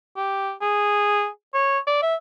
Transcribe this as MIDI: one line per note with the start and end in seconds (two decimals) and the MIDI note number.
0.17 0.52 67
0.62 1.27 68
1.54 1.79 73
1.87 2.01 74
2.02 2.15 76